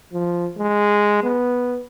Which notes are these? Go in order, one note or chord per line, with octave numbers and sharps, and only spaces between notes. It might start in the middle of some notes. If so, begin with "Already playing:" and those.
F3
G#3
B3